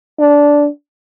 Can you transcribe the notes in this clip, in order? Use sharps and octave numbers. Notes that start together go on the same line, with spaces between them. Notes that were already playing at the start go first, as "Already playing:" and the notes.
D4